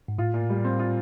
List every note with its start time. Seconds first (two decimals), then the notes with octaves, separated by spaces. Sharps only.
0.08 G#2
0.18 A2 F4
0.34 A#2
0.50 G3
0.64 C4
0.79 F4